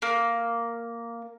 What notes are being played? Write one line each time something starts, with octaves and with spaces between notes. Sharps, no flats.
A#3